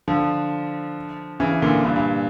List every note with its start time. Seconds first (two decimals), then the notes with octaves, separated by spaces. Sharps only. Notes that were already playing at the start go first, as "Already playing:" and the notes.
0.08 D3 F3
1.40 C#3 E3
1.62 A#2 D3
1.84 G2 A#2
1.96 G2